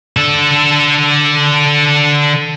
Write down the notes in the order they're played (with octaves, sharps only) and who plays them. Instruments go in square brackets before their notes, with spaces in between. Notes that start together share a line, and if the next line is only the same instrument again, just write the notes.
[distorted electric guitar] D3 A4